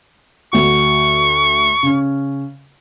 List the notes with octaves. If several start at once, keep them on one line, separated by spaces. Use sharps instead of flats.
D2 F#4 C#6
C#3 C#4